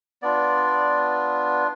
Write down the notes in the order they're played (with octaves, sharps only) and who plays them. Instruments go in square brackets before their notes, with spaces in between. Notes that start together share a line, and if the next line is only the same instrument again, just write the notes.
[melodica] B3 D4 F4 D5